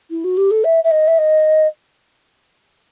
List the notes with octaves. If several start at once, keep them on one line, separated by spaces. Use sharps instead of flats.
E4
F#4
G4
A4
E5
E5
D#5
E5
D#5